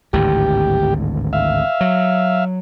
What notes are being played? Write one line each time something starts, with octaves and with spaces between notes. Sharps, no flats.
G#1 D2 A2 G4
E5 F5
F#3